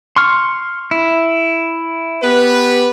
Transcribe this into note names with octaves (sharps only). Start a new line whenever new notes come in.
C6 C#6 F6
E4
B3 G4 B4